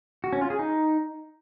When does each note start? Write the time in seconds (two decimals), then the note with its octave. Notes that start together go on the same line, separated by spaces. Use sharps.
0.24 F#4
0.33 C#4
0.41 F4
0.50 G#4
0.59 D#4